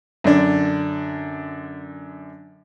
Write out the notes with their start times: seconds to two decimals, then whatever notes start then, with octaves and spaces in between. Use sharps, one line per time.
0.24 F#2 D3 D4